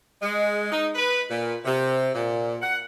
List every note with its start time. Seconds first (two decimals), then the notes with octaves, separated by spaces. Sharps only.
0.21 G#3
0.71 D#4
0.95 B4
1.28 A#2
1.65 C3
2.13 A#2
2.62 F#5